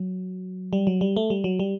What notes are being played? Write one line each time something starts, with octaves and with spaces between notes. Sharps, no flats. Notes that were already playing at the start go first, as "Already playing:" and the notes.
Already playing: F#3
G3
F#3
G3
A3
G3
F#3
G3